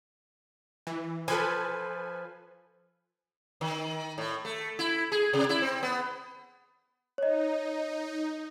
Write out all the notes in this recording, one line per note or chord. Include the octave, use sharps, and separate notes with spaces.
E3
F3 A4 B4 G#5
D#3
A2
A3
E4
G#4
C3
E4
C4
B3
D#4 C#5 D#5